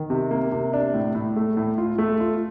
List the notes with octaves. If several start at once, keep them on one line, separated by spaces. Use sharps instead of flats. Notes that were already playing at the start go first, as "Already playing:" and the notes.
Already playing: D#3
C3
A#3
C3
D4
A2
A2
A3
A2
F4
A3
F4